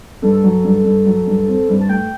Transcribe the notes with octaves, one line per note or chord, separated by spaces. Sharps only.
G2 A4
F#3
G2
G2
F#3
G2
C4
G2
A5
A3 G5